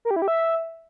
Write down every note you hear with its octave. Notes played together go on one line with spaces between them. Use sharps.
A#4
G4
E4
G4
E5